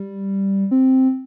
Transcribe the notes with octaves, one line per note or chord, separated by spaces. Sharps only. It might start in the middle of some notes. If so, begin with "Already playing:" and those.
Already playing: G3
C4